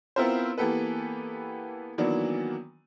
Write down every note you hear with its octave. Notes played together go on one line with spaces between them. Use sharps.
B3 C4 E4 F4 A#4 C5
E3 A#3 B3 G4 A4 B4
D#3 E3 F#3 A#3 B3 D4